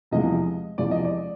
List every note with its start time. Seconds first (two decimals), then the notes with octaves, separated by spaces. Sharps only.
0.11 E2 C3 F3 G#3 D#5
0.78 E2 C3 F3 G#3 D5
0.91 D#5
1.05 D5